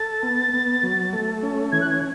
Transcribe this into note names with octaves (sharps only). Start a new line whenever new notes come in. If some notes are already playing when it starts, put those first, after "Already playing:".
Already playing: A4 A6
B3
B3
F#3
A3
C#4
E3 G#6
F#6
G#6